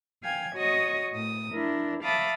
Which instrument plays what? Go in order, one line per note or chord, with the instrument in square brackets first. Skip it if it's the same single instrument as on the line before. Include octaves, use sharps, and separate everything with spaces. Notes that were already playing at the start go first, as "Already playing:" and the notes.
[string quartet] F5 G5 G#5 G#6
F#4 C#5 D#5 C#6 D#6
A2 D#6
D4 E4 A#4
E5 F5 A5 B5 D6 D#6